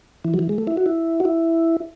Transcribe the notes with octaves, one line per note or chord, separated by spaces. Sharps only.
E3
F#3
E3
G#3
A3
E4
F#4
E4
F#4
E4